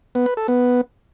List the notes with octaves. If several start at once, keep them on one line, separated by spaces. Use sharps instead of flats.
B3
B4
A4
B3